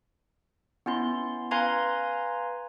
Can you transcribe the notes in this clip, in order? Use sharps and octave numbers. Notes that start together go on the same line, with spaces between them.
B3 C#4 E4 C6
B4 F5 G#5 A#5 C6 G#6